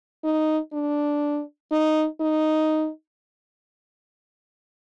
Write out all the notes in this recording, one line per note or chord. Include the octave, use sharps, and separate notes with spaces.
D#4
D4
D#4
D#4